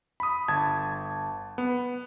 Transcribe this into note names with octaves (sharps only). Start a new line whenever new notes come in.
B5 D#6
G1 A5 G#6
B3